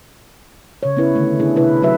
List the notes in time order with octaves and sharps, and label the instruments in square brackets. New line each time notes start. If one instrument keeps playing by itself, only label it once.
[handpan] C#3 C#5
B3 C#4 E4 B4
D3 D#3 A3
C#3 B3 D4 E4 G#4
C3 E4 B4
F#3 E4 F#4 B4 E5